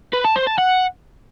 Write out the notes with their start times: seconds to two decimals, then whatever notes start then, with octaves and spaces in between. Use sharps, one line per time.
0.13 B4
0.24 A5
0.36 C5
0.47 A5
0.58 F#5